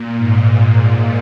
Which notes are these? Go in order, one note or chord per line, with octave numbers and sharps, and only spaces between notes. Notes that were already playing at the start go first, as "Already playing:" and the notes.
Already playing: A#2
G#2